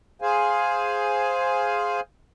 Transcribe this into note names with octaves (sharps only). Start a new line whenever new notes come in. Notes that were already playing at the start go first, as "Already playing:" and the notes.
G#4 C5 F5 G#5